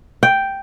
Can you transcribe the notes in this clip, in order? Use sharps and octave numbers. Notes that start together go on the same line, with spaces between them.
G5